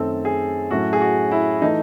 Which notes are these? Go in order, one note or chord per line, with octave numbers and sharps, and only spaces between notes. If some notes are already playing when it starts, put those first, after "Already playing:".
Already playing: F#2 D#3 A3 C4 A4
G#4
A2 F#3 A3 C#4 F#4
G#4
F#4
E4
E3 A3 D#4